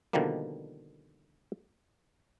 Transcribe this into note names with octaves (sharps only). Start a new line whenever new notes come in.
B2 D3 D#3 F3 G3 A#3